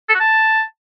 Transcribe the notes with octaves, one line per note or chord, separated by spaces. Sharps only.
A4
F#4
A5